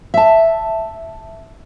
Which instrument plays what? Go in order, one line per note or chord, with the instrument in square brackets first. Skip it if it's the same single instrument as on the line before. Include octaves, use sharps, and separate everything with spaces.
[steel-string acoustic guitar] E5 A5